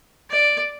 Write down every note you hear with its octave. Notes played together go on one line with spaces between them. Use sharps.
D5